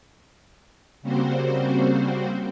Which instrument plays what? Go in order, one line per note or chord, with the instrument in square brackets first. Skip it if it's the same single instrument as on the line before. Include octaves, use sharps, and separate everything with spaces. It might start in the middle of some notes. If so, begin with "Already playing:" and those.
[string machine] C#3 G3 A#3 C4 F#4 C5